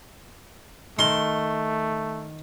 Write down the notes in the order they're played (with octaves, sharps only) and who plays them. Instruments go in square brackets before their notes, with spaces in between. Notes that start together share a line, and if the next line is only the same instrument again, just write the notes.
[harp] D#3 [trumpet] A3 [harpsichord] C6